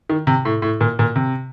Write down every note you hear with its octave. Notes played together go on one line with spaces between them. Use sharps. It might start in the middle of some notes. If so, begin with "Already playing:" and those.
D#3
C3
A2
A2
A#2
A#2
C3